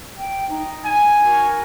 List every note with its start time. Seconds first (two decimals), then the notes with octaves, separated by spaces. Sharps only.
0.15 G5
0.48 D#4
0.85 G#5
1.22 F#4 A#4 C#6